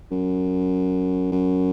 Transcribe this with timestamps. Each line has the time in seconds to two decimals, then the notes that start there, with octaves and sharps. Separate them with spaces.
0.11 F#2
1.32 F#2